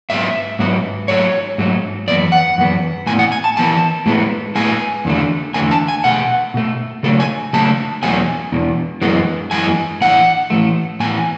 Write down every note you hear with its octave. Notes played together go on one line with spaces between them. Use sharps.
G#2 F#3 B3 E5
G#2 F#3 B3
G#2 F#3 A3 C#5
G#2 F#3 A3
F#2 E3 B3 D5
F#5
F#2 E3 B3
A2 E3 B3 G#5
F#5
G#5
A5
A2 E3 B3 A5
A2 G#3 B3
A2 G#3 B3 G#5
E2 D3 A3
E2 D3 A3 G#5
A5
G#5
B2 A3 F#5
B2 A3
C#3 F#3 A3 A4
G#5
C#3 F#3 A3 A5
E2 B2 F#3 A3 G#5
E2 B2
F#2 E3 G#3 B3
F#2 E3 G#3 B3 G#5
A2 E3 A3 F#5
A2 E3 A3
A2 E3 B3 G#5